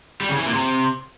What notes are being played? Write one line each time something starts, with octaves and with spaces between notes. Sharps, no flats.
G3
C#3
E3
A#2
C3